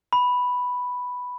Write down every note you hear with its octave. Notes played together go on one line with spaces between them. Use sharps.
B5